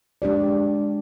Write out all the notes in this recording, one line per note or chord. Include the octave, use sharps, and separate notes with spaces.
G#3 D4 G4 D5